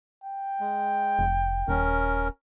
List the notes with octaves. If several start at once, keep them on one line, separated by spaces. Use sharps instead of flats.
G5
G#3
F1
D#1 C#4 A#4